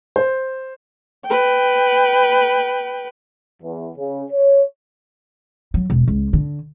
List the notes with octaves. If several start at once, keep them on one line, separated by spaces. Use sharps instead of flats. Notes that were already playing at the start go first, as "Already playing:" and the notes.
C5
B4 G5
E2
C#3
C#5
F#3
E1
C#2
D3